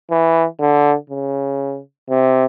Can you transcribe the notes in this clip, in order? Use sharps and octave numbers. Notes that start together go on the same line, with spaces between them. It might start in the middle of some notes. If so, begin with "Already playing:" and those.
E3
D3
C#3
C3